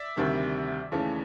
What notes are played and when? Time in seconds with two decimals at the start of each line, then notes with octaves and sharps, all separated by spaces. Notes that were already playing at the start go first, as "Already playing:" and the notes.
Already playing: D5 E5
0.16 D2 C3 D#3 G3
0.91 D#2 C#3 E3 A3 C#4